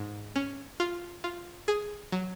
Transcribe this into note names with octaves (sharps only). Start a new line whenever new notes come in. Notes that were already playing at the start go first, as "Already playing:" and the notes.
Already playing: G#2
C#4
F4
F4
G#4
F#3